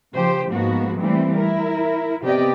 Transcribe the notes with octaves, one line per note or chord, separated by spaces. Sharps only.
C#3 F3 G4 C5
G#2 F3 A#3 B3 F#4
E3 G3 A3 A#3 C4
E4 A#4
C3 B3 G4 D5 D#5